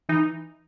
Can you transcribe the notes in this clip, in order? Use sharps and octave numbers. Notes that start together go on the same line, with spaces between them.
E3 D#4